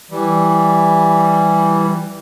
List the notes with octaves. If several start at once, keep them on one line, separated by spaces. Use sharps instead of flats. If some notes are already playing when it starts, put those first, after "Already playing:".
E3 G3